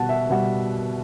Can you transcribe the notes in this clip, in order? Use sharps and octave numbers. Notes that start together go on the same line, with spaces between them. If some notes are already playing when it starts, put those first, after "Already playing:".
Already playing: B2 G3 F#5 A5
E5
B2 G3 F#5